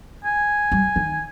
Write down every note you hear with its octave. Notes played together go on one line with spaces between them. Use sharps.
G#5
G3
D#3